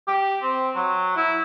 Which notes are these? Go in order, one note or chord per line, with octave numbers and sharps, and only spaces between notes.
G4
C4
F#3
E4